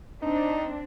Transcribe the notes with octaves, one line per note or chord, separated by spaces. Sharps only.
C4 D4 D#4